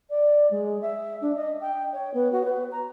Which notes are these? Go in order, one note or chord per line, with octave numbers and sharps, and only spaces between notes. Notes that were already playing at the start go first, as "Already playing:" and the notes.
D5
G#3
E5
D4
D#5
G5
C#5
B3
F#4
B4
A#5